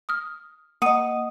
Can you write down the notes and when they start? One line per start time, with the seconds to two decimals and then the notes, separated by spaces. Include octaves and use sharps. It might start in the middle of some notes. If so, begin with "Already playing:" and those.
0.09 D#6 F6
0.82 A#3 D#5 F#5 D#6